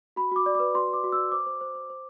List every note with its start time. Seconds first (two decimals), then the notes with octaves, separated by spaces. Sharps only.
0.16 F#4 B5
0.32 F#4 D6
0.46 D5
0.55 B4 D6
0.74 F#4 C6
0.88 B4
0.93 D6
1.04 F#4
1.12 D5 E6
1.32 C5 D6
1.46 C5
1.61 C5
1.75 C5
1.90 C5